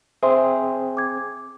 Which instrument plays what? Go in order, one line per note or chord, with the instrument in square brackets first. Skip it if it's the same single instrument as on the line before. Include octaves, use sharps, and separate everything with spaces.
[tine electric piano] C4 G#4 [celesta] C5 E5 C6
[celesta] D6 G#6